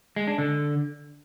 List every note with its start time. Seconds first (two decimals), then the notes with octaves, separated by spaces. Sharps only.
0.16 G#3
0.27 D4
0.38 D3